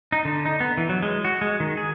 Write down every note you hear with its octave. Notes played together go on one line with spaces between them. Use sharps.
D#4
D3
D#4
B3
E3
F#3
G#3
F#4
G#3
D#3
G#4